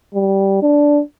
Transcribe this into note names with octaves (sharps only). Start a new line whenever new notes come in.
G3
D4